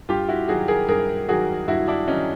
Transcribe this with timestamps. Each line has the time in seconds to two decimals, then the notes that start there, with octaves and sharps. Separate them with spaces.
0.09 G2 F4 G4
0.29 E4 F#4
0.48 D#3 F#3 F#4 G#4
0.68 G#4 A#4
0.88 G2 G#4 A#4
1.28 D#3 F#3 F#4 G#4
1.68 G2 E4 F#4
1.88 D4 E4
2.08 D#3 F#3 C#4 D#4